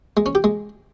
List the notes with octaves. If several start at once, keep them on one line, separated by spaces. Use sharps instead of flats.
G#3
C#4
G4
G#3